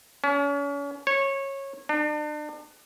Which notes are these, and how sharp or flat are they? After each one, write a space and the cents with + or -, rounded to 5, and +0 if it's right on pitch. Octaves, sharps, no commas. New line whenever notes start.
C#4 +35
C#5 -20
D4 +40